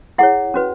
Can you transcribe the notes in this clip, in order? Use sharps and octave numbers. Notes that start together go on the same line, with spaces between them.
E4 G#4 C#5 F#5
C#4 F#4 B4